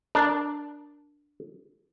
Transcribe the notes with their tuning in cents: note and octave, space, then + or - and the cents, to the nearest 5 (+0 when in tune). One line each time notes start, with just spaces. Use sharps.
D4 +0 A#4 +5 C#5 +30